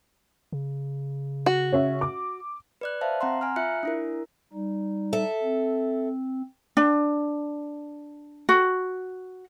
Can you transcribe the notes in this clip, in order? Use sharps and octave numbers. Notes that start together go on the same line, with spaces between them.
C#3
F#4
C#4 C#5 E5
D6
B4 D5 F#6
C5 E5 F5 A5
C4 F#5 A#5 C6
G#5 A#5 F6
F4 E5 F#6 C#7
D4 E4 A#4
G3 D#4
A4 E5
C4
D4
F#4